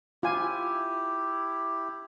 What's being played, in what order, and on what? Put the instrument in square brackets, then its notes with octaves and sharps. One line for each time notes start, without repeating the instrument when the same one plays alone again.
[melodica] E4 G4 [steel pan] F4 G#5